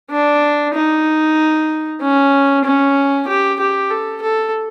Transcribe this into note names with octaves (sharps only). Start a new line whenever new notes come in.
D4
D#4
C#4
C#4
G4
G4
A4
A4